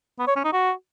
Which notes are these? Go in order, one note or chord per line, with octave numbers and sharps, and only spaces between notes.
B3
C#5
C#4
D#4
F#4